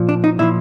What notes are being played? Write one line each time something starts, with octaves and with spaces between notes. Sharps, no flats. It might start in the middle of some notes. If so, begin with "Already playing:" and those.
Already playing: A#2 F3
D4
D#4
A#2 F3 E4